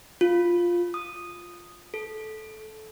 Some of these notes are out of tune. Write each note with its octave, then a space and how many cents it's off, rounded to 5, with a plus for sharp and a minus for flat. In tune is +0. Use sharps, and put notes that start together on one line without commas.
F4 +0
D#6 -5
A4 -15